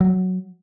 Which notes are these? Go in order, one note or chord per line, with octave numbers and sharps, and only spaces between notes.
F#3